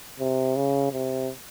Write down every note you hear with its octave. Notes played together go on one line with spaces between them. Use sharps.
C3
C#3
C3